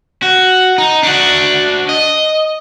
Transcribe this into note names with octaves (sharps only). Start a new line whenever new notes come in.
F#4
D#4
D4 F#4
D#5